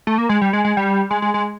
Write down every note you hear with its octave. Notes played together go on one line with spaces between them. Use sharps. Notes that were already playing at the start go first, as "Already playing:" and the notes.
A3
A#3
G#3
G3
G#3
G#3
G3
G#3
G#3
G#3